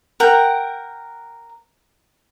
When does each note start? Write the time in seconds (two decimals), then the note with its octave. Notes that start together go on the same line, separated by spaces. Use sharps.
0.20 A#4 F#5 G5